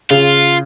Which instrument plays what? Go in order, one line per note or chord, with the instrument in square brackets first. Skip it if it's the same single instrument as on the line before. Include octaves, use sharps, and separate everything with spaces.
[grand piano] C#3 [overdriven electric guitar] F4